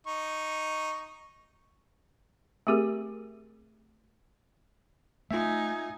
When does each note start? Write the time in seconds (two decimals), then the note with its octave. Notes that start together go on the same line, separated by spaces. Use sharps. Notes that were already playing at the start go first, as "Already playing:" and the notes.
0.07 D#4 C#6
2.67 A3 C4 G4 G#4 A#4
5.31 A3 D#4 F4 E5 G#5